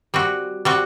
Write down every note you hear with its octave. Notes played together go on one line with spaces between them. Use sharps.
G3 C4 F#4
G3 C4 F#4